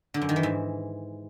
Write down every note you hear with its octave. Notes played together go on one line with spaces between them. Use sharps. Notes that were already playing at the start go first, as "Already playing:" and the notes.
D3
F#2
D#3
E3
G#2